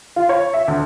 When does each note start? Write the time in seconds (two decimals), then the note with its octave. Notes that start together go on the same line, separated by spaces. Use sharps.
0.16 F4
0.29 C#5
0.53 E5
0.68 D2